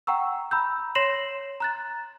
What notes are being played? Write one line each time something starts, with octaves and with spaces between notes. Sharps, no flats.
F#5 G5 A#5 C#6 E6
A#5 B5 E6 G6
C#5 C6 A#6 C7 E7 F#7
A#5 F#6 A6